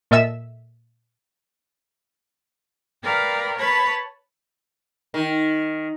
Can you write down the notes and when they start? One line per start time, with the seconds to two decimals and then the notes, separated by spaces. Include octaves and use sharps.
0.11 A#2 A4 D#5 E5 E6 E7
3.02 A#4 B4 D5 F5 G5
3.56 B4 C#5 A5 B5
5.14 D#3